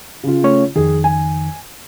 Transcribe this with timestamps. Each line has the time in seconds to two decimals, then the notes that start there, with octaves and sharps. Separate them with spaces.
0.23 C#3 F4
0.44 A3 C#4 C#5
0.76 F2 D#3 G#4
1.04 G#5